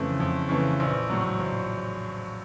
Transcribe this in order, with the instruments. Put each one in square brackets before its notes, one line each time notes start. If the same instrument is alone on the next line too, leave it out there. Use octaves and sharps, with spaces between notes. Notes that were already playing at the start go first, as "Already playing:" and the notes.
Already playing: [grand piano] F2 C#3 E3 A3
F2
C#3 E3 A3
A#1
A2 F#3
A#1